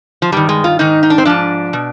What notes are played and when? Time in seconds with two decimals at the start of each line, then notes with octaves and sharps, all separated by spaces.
0.22 F3
0.32 G2 D#3 G3
0.49 G#3
0.64 F4
0.79 G#2 D#3 D#4
1.03 D#4
1.10 D4
1.18 C4
1.25 G#2 F3 D4
1.73 B2